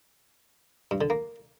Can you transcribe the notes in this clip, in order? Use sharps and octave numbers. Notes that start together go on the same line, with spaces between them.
G2
D3
A#3